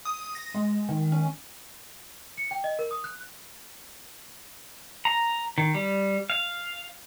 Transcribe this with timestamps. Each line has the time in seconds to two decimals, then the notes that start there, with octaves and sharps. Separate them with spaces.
0.05 D#6
0.35 A#6
0.54 G#3
0.89 D#3
1.12 C#4
2.38 C#7
2.51 G5
2.64 D#5
2.79 A#4
2.91 D#6
3.04 F#6
5.05 A#5
5.58 D#3
5.75 G3
6.30 F5